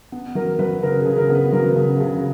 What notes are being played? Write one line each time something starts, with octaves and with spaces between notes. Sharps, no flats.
B3
F#3 A#4
F#3 B4
C#3 A#4
G#4
C#3
A#4
B3
B4
F#3 A#4
C#3
C#3